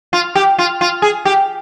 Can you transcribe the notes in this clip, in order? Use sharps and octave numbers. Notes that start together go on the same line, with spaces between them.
F4
G4
F4
F4
G#4
G4